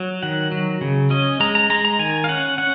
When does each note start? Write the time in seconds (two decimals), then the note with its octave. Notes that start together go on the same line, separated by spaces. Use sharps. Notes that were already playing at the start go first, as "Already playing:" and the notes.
Already playing: F#3
0.23 D#3 F#5
0.52 F#3
0.81 C#3
1.10 C#4 D#5
1.40 G#3 A#5
1.55 A#5
1.70 G#3 A#5
1.85 A#5
1.99 D#3 G#5
2.24 F5
2.29 C#4 F#5
2.58 C#4 F#5